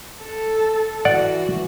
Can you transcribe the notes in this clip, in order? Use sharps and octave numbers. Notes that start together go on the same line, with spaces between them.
A4
E3 F#4 D5 F#5